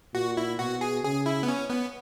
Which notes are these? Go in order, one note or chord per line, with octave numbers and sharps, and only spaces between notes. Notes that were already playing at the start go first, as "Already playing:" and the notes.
A#2 F#4
E4
B2 F#4
G#4
C#3 G#4
E4
B3
C#4
B3